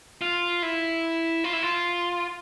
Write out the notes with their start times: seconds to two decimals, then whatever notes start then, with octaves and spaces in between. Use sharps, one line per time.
0.21 F4
0.63 E4
1.44 F4
1.53 E4
1.63 F4